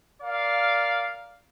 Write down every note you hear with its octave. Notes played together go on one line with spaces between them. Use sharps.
A#4 D5 F5